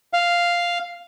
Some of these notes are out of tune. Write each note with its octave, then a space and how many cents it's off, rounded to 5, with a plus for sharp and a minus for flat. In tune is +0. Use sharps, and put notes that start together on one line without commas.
F5 +0